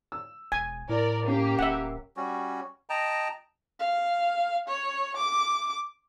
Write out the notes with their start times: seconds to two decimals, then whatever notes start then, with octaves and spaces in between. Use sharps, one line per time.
0.12 E6
0.52 E1 G#5
0.89 A2 E4 A#4 D5
1.28 A#3 C#4 G4
1.59 D1 E5 F#5
2.17 G3 C#4 F#4
2.90 D#5 G5 A5 A#5
3.80 F5
4.68 C#5
5.16 D6